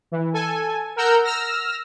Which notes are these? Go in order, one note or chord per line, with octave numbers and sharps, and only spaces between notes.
E3
A4 G#5
A#4 F#5 A#5 E6 F6 G6
E6 F6 A#6